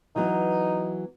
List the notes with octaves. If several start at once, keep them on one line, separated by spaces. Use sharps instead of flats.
E3 F#3 B3 D#4